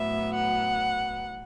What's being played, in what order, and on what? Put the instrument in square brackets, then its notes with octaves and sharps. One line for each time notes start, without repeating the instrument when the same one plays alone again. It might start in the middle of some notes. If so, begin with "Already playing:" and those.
Already playing: [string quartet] A2 F#3 B3 E5
F#5